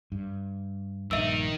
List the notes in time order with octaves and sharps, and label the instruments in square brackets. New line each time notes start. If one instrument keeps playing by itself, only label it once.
[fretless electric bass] G2
[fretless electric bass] A#1 G2 [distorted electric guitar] D#3 D#4 [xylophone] E5 E6